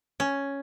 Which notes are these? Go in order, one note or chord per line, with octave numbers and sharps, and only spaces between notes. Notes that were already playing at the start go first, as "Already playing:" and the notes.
C#4